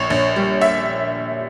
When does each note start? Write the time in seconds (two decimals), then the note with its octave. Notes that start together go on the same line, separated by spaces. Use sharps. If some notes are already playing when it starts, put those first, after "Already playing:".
Already playing: A#1 C#5
0.10 A#1
0.36 G3
0.61 E5